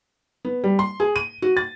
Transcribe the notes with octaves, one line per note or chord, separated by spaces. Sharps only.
B3
G3
C6
G#4
D#7
F#4
A6